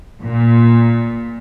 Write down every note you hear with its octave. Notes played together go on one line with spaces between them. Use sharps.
A#2